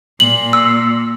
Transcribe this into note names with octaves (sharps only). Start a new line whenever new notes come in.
A#2 F#7
E6